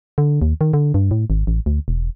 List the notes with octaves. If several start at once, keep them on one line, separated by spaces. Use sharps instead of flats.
D3
D#2
D#3
D3
G2
A2
G#1
A1
D2
E1